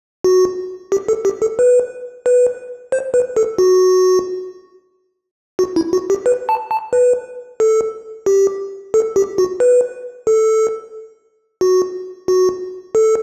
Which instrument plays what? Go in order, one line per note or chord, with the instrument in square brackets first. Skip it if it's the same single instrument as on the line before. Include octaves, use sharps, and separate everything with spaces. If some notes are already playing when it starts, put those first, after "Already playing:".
[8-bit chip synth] F#4
G4
A4
G4
A4
B4
B4
C5
B4
A4
F#4
F#4
E4
F#4
G4
B4
A5
A5
B4
A4
G4
A4
G4
F#4
B4
A4
F#4
F#4
A4